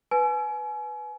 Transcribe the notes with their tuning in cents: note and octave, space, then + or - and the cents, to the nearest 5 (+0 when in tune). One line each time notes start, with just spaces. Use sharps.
B4 +0 G#5 +35